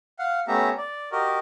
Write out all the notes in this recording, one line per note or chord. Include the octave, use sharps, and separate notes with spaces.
F5 F#5
A3 B3 C#4 G4 E5 A#5
D5
F#4 G4 A#4 D#5